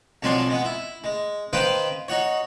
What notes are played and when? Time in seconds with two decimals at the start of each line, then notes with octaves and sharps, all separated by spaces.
0.23 B1 F2 F#3 D4 G#5 C6
0.49 G#3 B3
0.65 E4
1.04 G#3
1.53 D#3 B4 C5 F5 G5 D#6
2.08 D#4 F#4 C#5